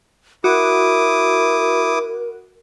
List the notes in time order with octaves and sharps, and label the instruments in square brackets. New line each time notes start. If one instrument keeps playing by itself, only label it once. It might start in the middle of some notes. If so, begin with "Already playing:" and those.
[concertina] E4 D6 D#6 [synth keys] F#4 [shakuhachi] A#4